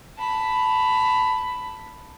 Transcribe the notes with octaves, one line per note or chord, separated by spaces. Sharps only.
A5 B5